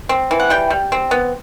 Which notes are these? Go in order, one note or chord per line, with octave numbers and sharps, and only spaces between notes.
C4
E3
F#5
G3 G5
G3
C4
B3